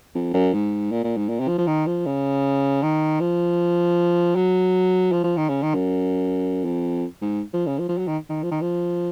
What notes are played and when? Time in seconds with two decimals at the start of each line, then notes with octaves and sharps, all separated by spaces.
0.15 F2
0.34 F#2
0.54 G#2
0.92 A#2
1.04 A#2
1.17 G#2
1.29 A#2
1.40 C3
1.48 F3
1.58 F3
1.67 D#3
1.86 F3
2.06 C#3
2.83 D#3
3.20 F3
4.36 F#3
5.12 F3
5.24 F3
5.37 D#3
5.49 C#3
5.62 D#3
5.75 F#2
6.65 F2
7.21 G#2
7.53 F3
7.67 C#3
7.79 F3
7.89 F3
7.98 F#3
8.08 D#3
8.30 D#3
8.43 F3
8.51 D#3
8.61 F3